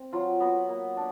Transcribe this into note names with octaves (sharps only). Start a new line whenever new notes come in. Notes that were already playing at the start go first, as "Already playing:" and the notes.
Already playing: C4
F#3 F4
B3 F#4
A#3
D4